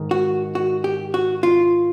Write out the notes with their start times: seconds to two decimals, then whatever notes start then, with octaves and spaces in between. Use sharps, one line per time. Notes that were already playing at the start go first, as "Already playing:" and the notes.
Already playing: G#2 D#3
0.11 F#4
0.55 F#4
0.84 G4
1.14 F#4
1.43 F4